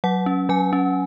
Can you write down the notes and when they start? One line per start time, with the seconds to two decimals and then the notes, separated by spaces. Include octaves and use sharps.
0.04 F#3 F#5
0.26 C#4
0.49 F#3 G#5
0.73 C#4